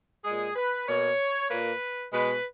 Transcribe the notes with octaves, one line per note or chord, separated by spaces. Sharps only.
A#2 G#3 G#4
B4
B2 A#3 C#5
A#2 A#3 B4
B2 G#3 B4